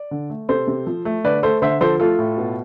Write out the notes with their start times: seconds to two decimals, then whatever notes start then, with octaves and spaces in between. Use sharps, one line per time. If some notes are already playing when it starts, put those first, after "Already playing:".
Already playing: D5
0.11 D3
0.30 A3
0.49 C3 A4 C5
0.67 C3
0.87 F3
1.05 A3
1.24 D3 B4 D5
1.43 A3 A4 C5
1.62 D3 C5 E5
1.81 F3 A4 C5
2.00 A3 F4 A4
2.18 A2
2.37 B2